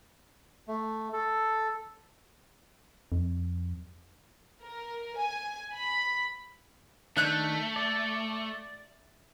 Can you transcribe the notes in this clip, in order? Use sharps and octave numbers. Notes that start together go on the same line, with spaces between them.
A3
A4
F2
A#4
G#5
B5
D#3 A3 D4 E5 F#6 G6
D5